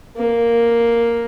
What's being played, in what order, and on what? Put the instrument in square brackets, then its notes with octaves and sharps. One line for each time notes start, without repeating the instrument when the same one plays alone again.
[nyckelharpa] A#3